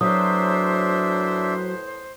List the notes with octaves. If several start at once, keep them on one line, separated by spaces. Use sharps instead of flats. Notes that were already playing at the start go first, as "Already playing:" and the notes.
A2 F#3 D4 B4 C5 E5 D#6